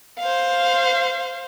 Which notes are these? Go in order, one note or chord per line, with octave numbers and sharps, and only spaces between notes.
C5 F5